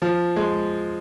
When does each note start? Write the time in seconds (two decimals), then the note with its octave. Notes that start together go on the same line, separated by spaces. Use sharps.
0.02 F3
0.36 G#3